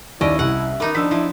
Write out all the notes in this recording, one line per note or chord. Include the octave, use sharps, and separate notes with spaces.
D#2 C#4 E4 D5 D#5 D7
C2 E5 F#5
D#3 B3 D#4 D6
F3 D4 E6 B6
F3 E4